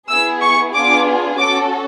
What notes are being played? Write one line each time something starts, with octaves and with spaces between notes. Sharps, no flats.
B3 E4 G#4 E6
C#6
B3 D4 F4 G#4 D6
C#4 F#4 A4 D6